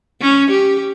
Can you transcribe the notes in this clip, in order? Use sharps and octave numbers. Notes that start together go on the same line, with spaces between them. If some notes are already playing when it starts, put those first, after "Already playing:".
C#4
G4